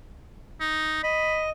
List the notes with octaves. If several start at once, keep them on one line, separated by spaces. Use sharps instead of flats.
D#4
D#5 B5